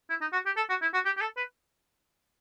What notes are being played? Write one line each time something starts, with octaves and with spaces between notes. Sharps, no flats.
E4
D#4
F#4
G4
A4
F#4
E4
F#4
G4
G4
A4
B4